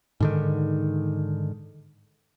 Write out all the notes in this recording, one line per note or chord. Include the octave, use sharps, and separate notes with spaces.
G#2 D3 D#3